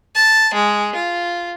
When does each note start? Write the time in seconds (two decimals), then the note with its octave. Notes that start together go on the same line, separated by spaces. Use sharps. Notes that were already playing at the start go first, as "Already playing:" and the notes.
0.15 A5
0.54 G#3
0.95 F4